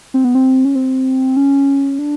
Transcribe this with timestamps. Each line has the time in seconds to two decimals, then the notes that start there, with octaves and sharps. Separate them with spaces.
0.14 C4
0.24 B3
0.35 C4
0.65 C#4
0.75 C4
1.37 C#4
1.99 D4